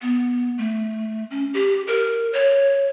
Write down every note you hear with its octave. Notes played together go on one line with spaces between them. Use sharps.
B3
A3
C#4
G4
A#4
C#5